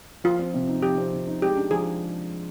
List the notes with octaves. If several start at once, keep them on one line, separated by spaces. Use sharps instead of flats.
F3 F4
C4
C3
D#4
F3 G4
C4
C3
D#4
G#3 G4
D4
F3 G#4